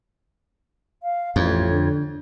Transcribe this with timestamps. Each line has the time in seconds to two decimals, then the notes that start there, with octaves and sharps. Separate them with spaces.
1.03 F5
1.36 A1 F2 C#5
1.70 D3